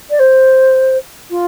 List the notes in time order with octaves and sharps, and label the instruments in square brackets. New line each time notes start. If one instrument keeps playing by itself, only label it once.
[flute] D5
C5
F4